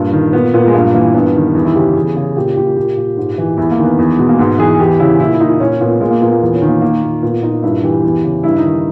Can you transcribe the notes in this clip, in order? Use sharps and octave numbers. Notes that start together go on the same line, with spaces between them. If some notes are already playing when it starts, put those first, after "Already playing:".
Already playing: G2 A#2
D#3
A#2 B3
A#2 B3
G#3
G2 A#3
E3 A#3
G2 B3
D#3
E2 B3
E4
C#3 G4
E2 G#4
C#3 G#4
A#2 G4
A#2 G4
A#2 G4
A#2
G#2
E3
E2 E4
A#3
D#3
B3
E2
B2 G#3
A#3
G#2 B3
E3 G#4
E2 G4
C#3 E4
A#2 E4
E4
A#2 D#4
A#2 C#4
A#2 B3
A#2 G#3
A#3
A#2 B3
A#3
E2 B3
C#4
D#3
A#3
A#2 A#3
A#2
A#2 B3
A#2 D#4
G2 E4
E3 G4
E2
C#3
G2 E4
D#4
D#3